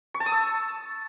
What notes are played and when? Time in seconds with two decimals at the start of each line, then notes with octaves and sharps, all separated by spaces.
0.14 C#6
0.20 A5
0.26 D#6
0.32 E6